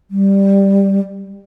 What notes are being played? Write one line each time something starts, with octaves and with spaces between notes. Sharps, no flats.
G3